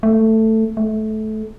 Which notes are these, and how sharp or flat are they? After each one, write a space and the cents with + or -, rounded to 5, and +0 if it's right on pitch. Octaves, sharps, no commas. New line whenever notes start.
A3 +10
A3 -20